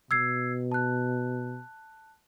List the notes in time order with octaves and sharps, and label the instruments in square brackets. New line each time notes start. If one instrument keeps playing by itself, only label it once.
[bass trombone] B2 [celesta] E6 G#6 C7
[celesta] A5 F#6